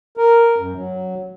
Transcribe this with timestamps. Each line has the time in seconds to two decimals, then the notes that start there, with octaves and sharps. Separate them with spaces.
0.17 A#4
0.57 F#2
0.75 F#3